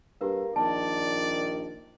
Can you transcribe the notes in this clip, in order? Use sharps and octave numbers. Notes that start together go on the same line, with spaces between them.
G2 A#3 G4 B4
A#1 D#3 D5 A5